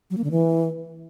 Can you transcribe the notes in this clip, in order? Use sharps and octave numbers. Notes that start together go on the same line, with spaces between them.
F#3
A#3
D3
E3